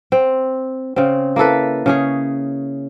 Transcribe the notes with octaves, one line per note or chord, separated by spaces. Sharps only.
C4
C#3 C4
A#3 E4 A4 B4
C#3 C#4 G#4